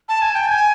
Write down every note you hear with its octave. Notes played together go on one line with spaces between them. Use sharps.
A5
G#5
G5
G#5